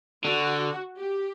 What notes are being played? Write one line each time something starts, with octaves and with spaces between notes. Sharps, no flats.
D3 F#4
G4